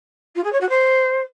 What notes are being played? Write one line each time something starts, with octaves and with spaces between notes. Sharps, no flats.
F4
G#4
C#5
F#4
C5